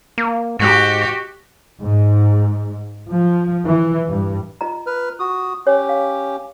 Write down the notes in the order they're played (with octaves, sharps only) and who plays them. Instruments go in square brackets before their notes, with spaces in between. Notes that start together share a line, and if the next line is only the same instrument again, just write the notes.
[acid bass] A#3
[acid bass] G#2 [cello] F#4 G4
[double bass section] G#2
F3
E3
G2
[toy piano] F4 D#5 A#5
[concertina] B4 F6
F#4 D#6
[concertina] C#4 G4 [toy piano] C#5
[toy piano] F5